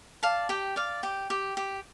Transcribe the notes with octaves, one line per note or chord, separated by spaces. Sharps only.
D5 F5 A5
G4 G5
D5 F5
G4 G5
G4
G4